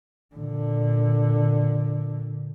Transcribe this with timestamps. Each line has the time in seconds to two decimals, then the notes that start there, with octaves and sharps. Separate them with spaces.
0.35 A#2 D3